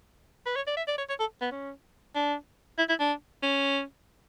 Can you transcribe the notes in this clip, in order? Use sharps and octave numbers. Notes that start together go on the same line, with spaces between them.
B4
C#5
D5
E5
D5
C#5
C#5
A4
B3
C#4
D4
E4
E4
D4
C#4